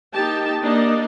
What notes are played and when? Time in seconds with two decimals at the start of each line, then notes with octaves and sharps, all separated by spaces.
0.13 A#3 D#4 G4 G5 A5
0.61 A#3 D4 D#4 D5 D#5